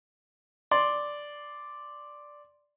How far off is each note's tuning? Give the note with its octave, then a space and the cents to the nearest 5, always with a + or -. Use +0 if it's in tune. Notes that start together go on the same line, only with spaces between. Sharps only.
D5 +0 C6 +0